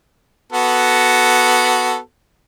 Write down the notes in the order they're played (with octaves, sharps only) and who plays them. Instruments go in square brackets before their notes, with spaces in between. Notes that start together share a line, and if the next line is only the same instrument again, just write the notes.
[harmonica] B3 F#4 A4